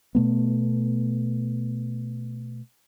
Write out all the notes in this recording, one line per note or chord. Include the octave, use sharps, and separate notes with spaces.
B2 A3 B3